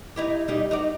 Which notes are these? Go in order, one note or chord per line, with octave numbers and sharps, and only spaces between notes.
D#4 E4 G4
G3 D#4 G4
D#4 F#4 D5